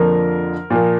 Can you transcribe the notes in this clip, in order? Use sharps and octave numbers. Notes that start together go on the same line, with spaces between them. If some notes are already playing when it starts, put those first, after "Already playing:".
Already playing: F2 D3 F3 A#3 A#4
A#2 F3 A#3